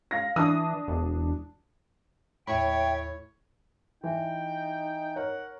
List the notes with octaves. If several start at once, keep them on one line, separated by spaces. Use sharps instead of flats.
F5 A#6
E3 D4 D#6
E1
D#2 A2 E4 C#5 E5 G5 B5
E3 D#4 G5
A#4 C#5 F#5